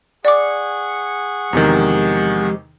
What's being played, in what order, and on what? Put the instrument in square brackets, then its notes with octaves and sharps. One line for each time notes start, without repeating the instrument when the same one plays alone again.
[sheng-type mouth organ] G#4 F#5 C#6 [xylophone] D5 D6
[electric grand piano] E2 C3 D#3 [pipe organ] F3 G#3 G4